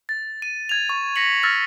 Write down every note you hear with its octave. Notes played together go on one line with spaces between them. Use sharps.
A6
D#7
G#6 F7
C#6
A#6 B6 C#7 F#7
E6 F6 A6 A#6